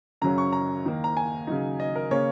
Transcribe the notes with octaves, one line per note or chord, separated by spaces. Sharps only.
F#2 C#3 F#3 C#4 A#5
C#6
A#5
D#2 D#3 A#3
A#5
G#5
C#3 F#3 D#4
D#5
A#4
C#3 A#3 C#4 C#5